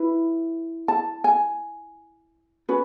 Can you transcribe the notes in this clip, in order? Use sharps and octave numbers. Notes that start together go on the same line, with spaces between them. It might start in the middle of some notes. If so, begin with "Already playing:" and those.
Already playing: E4 B4
A5
G#5
C#4 F#4 B4